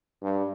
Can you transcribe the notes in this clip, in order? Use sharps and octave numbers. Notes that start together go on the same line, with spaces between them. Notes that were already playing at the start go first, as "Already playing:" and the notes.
G2